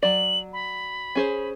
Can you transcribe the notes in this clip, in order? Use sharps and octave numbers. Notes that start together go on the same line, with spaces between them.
F#3 D5 F#7
B5
C#4 G#4 C5